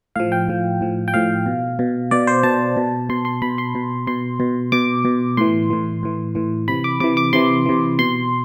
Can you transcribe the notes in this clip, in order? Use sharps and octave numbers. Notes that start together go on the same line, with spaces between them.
A2 F3 F5
G5
A2 F3
A2 F3
G5
A2 F3 F5
B2
B2
B2 D5
C5
B2 A5
B2
B2 C6
C6
B2 B5
C6
B2
B2 C6
B2
B2 D6
B2
A2 E3 C6
A2 E3
A2 E3
A2 E3
C3 E3 B5
D6
C3 E3 D6
D6
C3 E3 C6
C3 E3
B2 C6